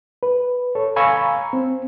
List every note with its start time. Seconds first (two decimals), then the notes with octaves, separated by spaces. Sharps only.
0.23 B4
0.75 A4 C#5
0.96 F5 G#5 A#5 B5 C#6 E6
1.53 C4